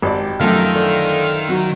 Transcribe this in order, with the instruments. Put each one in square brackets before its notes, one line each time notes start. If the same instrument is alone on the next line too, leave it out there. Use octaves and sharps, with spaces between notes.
[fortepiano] G#1 D5 [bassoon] G4
[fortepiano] F#2 F3 A3 [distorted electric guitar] D#3 [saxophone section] C4 E5 F5
[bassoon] D3
[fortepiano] F#3